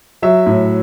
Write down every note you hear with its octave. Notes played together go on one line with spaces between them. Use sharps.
F#3 E5
A2